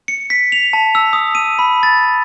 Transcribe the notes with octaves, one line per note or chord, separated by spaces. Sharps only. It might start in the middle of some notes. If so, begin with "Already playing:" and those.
C#7
B6
F7
A5
E6
D#6
D#7
B5
A6